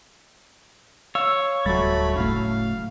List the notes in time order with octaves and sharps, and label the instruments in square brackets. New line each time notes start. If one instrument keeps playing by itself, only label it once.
[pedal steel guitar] C#5 [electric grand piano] F5 E6
[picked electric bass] D1 G3 [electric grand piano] F#3 A6 [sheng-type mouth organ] A3 B5
[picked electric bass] F#1 A2 A3 [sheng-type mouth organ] F5